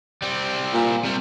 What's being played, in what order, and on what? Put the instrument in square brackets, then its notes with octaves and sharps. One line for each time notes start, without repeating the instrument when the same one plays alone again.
[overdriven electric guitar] G3 C4
[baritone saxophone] A#2
[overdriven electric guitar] C3 G3